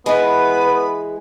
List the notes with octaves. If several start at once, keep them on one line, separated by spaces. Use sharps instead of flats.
E3 G#3 B3 B4 B5